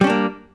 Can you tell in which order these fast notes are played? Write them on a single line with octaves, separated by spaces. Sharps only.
G3 C#4 D4 A#3